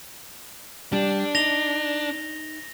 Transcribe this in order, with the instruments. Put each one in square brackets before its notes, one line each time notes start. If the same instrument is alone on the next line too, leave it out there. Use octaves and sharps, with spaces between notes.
[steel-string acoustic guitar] G3 [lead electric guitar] D4
[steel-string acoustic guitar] D#4 [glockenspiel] A#6 F7 G7